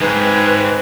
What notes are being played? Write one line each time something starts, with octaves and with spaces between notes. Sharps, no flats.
G#2 G#3 C4 B4